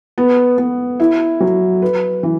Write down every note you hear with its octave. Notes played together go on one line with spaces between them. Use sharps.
B3
B3
E4
F#3
B4
E3